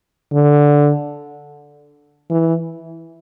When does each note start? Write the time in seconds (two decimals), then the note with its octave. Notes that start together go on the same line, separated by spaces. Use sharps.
0.33 D3
2.30 E3